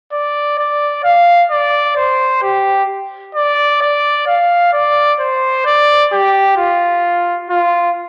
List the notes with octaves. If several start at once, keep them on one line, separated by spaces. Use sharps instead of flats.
D5
D5
F5
D5
C5
G4
D5
D5
F5
D5
C5
D5
G4
F4
F4